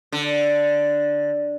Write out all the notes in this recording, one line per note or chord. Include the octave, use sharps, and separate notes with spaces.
D3